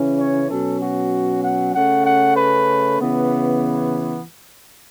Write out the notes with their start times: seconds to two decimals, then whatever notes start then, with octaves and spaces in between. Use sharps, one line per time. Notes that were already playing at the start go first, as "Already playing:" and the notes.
Already playing: C#3 E3 C#4
0.19 C#5
0.49 B2 F#3 C#4 A4
0.81 F#4
1.44 F#5
1.74 C#3 A3 C#4 F#5
2.06 F#5
2.36 B4
2.99 C#3 E3 B3